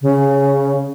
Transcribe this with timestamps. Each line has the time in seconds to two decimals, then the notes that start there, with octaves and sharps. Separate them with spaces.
0.01 C#3